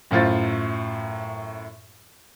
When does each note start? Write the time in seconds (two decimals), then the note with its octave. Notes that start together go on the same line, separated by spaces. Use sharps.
0.11 F#2 A2 F4 C5 A6